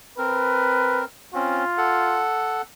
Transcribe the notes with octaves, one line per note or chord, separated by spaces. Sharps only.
C4 A#4 B4
C4 C#4 F4
A4 F#5